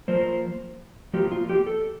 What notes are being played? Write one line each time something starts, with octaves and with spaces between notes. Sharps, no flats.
F3 A#3 F4 C5
F3 A#3 F4 G4
F4
G4
A4